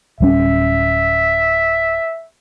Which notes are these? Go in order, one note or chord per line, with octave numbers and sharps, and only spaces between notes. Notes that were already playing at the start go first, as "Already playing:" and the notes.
D1 G3 C#4 E5